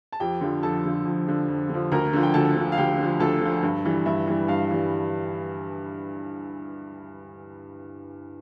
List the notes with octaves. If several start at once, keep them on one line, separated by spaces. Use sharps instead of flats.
A5
F2 G4 G5
D3 F3
F2 A4 A5
D3 F3
F2
D3 F3
F2
D3 F3
D2 A#4 A#5
D3 F3
G5
D2 A4 A5
D3 F3
F5
D2 G4 G5
D3 F3
D2 A4 A5
D3 F3
G2
E3 G3
G2 E5
E3 G3
G2 F5
E3 G3